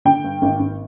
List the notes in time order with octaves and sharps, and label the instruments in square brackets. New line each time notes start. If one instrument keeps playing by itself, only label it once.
[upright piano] D3 G5
G2
G#1
G#1